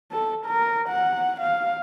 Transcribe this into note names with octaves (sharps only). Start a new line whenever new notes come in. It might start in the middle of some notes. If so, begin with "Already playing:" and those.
A4
A#4
F#5
F5